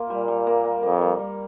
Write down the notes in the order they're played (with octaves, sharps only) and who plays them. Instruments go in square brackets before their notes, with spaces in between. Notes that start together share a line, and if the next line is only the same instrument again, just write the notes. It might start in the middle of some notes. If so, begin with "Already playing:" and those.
Already playing: [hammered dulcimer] A#3 F4
[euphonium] A#2 [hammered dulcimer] G3
[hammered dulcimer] G3
A#3
A#3
[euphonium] F2 [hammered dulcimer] A#3
[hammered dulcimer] G3
G3